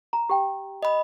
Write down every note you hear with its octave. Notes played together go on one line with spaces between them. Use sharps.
A#5
G4 G5
D#5 B5